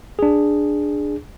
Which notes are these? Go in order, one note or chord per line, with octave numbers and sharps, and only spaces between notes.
D4 G#4